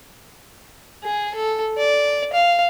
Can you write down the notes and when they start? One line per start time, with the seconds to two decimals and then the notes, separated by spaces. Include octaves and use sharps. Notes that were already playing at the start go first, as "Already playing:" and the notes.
1.04 G#4
1.34 A4
1.77 D5
2.33 F5